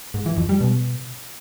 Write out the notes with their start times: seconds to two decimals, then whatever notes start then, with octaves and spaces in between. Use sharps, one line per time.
0.14 G#2
0.26 E3
0.37 F2
0.49 G3
0.61 B2